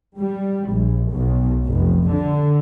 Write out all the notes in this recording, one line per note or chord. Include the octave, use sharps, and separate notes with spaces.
G3
A#1
B1
F1
D3